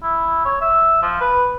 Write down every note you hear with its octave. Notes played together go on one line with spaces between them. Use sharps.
E4
C#5
E5
F3
B4